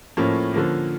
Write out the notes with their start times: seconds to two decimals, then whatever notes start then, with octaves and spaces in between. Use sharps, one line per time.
0.17 A2 F3 A#3 C#4
0.54 D3 F3 A#3